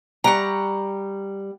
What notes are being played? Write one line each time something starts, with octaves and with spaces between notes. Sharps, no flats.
G3 F#5 G5 A#5 C#6